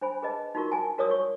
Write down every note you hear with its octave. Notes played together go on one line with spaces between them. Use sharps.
D4 C5 G#5 B5
G#4 B4 D#5 A5
D#4 F4 F#4 A#4 C#6
A#4 G#5 A5
F#4 A#4 C#5 D5 D#6 E6
C#5 C#6